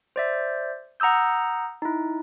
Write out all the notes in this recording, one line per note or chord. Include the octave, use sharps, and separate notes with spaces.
C5 D5 E5
F#5 A#5 D#6 E6 G6
D#4 E4